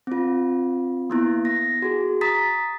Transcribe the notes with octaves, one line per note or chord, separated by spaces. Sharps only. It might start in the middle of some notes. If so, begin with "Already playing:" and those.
C4 F4
A#3 B3 E4
A#6
F#4 G#4
A#5 D#6 A6 B6